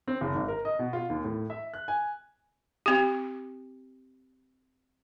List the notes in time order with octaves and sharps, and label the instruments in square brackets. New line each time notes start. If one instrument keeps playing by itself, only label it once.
[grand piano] C4
F#1
G#1
A#4
D#5
B2
F4
D#2
A2
E5
F#6
G#5
[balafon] C4 G4